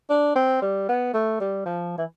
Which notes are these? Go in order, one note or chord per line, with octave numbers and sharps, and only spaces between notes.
D4
C4
G3
B3
A3
G3
F3
E3